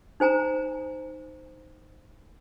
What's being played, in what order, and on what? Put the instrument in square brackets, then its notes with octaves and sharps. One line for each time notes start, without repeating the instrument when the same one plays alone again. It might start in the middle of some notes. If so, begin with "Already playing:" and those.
[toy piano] D#4 C5 G#5 A#5